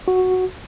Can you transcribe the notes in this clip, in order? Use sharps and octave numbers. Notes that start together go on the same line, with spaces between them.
F#4